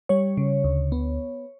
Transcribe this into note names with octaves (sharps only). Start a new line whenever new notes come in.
G3 C#5
C#3
D2
B3